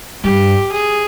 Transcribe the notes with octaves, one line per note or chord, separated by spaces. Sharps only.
G2 G4
G#4